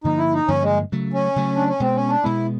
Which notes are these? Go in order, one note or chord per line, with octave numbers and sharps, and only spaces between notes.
G2 D3 F3 A#3 D#4
E4
D#4
G2 D3 F3 A#3 C#4
G#3
C#3 F#3 A3
C#4
C#3 F#3 A3
D4
C#4
B2 G#3 B3 C4
C#4
D4
B2 G#3 B3 E4